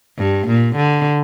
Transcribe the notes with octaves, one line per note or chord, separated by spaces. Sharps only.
G2
A#2
D3